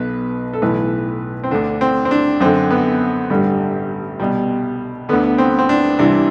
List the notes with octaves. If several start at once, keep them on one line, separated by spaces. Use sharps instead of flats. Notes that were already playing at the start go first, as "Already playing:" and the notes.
Already playing: B1 B2 B4
A4
B1 A2 E3 B4
C4
D2 D3 D4
C4
C4
D4
F#2 D3 C4
B3
A1 G2 D3 G3
C2 B2 G3
D2 D3 B3
C4
C4
D4
C2 C3 E3 D4